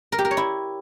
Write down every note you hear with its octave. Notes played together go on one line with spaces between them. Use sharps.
A#4
G4
A#4
C#5
E4